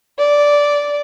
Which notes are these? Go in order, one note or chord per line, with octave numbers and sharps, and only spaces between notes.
D5